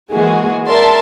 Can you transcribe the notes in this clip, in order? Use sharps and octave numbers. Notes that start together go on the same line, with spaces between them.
E3 G#3 A#3 F#4 G#4
A#4 D5 E5 A5 C6